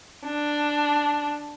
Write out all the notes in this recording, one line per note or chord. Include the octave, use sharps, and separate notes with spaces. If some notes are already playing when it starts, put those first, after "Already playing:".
D4